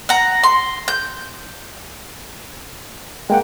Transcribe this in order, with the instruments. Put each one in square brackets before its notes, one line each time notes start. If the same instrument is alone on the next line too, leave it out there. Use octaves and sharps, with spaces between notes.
[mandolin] F#5 A#5
C6
G6
[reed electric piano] G#3 A#3 F#5 [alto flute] G5